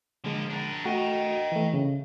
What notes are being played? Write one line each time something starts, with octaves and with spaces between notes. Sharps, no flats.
D3 F3 G#3 A#3
D4 A#4
A3 F#4 D#5 G5
E3 A3
C#3